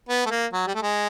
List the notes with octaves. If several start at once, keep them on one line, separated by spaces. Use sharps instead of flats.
B3
A3
A#3
F#3
G3
A3
G#3